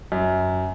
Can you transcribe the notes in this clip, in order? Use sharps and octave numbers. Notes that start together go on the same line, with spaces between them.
F#2